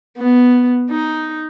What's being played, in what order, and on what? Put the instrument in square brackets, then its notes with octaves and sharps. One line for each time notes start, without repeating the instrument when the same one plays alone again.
[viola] B3
D#4